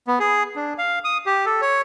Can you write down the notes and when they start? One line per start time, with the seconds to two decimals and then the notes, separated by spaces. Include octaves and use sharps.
0.07 B3
0.20 G#4
0.56 D4
0.78 F5
1.04 D#6
1.26 G4
1.46 A4
1.61 C#5